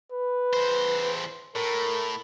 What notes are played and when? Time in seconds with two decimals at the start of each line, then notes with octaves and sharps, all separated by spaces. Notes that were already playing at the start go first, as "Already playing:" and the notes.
0.12 B4
0.53 E2 C5
1.55 A2 A#4